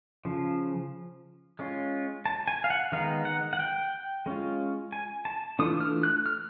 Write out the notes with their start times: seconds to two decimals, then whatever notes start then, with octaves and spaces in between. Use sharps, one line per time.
0.25 C#3 F3
1.59 G#3 C#4 F4
2.26 A5
2.48 G#5
2.64 F5
2.70 F#5
2.92 D#3 G#3 B3 D#4 F5
3.25 F#5
3.53 F#5
3.59 G5
4.26 G#3 C#4 F4
4.92 G#5
5.25 A5
5.59 E3 A3 D4 F4 D#6
5.80 F6
6.03 F#6
6.26 F6